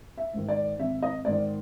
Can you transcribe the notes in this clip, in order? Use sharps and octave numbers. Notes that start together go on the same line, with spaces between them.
E5
G#2 D#3
D5
G#1 E5
D#5
G#2 D#3 D5